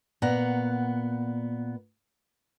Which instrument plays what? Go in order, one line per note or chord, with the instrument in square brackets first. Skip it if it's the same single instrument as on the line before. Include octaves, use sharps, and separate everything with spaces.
[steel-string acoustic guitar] A#2 B3 F#5 A#5